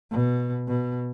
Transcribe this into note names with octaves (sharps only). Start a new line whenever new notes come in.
B2
B2